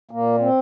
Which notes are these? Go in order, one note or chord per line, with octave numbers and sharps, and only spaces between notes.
A#2 A#3
C4